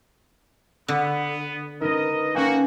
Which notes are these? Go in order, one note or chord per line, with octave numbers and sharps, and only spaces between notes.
D3 B3
B3 D#4 A#4 D#5
A#3 C#4 F#4 G5 G#5